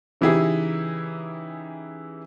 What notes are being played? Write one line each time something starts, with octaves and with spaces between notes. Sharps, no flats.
C#3 E3 D#4 E4 G4 G#4